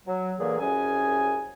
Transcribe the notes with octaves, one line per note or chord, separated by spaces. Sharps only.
F#3
A#2 D3 E3 F#3 A#3 G#4
C2 F#2 C#4 G#4 G#5